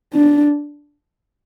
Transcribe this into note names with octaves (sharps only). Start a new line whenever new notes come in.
D4